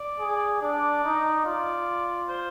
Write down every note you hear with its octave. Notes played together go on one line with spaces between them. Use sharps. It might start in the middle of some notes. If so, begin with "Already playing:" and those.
Already playing: D5
G#4
D4 D5
D#4
F4 D5
C5